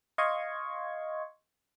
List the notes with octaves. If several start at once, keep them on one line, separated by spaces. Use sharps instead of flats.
D#5 F5 C6 C#6 G#6